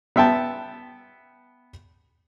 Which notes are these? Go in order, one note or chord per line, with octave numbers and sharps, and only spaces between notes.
B3 E5 G5 A5